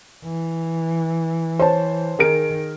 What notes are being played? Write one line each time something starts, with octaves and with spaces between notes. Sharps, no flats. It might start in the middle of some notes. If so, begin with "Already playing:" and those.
E3
C5 C#5 A5
D#3 G#4 A#4 D7